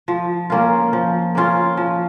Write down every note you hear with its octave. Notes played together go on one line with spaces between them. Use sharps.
F3
A#3 C#4 F4
F3
A#3 C#4 F4
F3